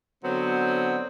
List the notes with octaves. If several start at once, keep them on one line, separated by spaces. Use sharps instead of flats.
D3 F#3 B3 C4